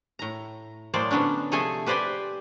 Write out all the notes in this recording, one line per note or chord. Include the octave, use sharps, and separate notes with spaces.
A2 A#5
A2 F#3 G#3 A#3 C5 D5
D3 F#3 B3 C#4 D4
C3 F3 A3 G#4 A4 G#5
G4 B4 C5 D5 G5 G#5